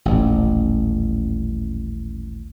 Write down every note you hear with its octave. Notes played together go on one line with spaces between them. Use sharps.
D#1 A1